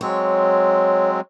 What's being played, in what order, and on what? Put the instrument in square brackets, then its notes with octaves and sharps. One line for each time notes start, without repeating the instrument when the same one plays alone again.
[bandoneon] F#3 G#3 C4 [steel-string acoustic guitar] C#5